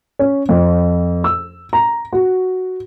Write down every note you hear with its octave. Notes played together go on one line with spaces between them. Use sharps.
C#4
F2
E6
A#5
F#4